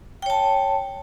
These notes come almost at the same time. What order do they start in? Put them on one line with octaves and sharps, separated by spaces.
G5 C#5 A5